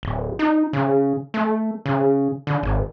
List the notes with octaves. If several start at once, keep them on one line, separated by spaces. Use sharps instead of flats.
D1
D#4
C#3
A3
C#3
D3
G#1